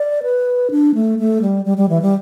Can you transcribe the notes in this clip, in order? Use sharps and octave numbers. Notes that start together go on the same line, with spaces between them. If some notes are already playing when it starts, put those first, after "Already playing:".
Already playing: D5
B4
D4
A3
A3
G3
G3
G3
E3
G3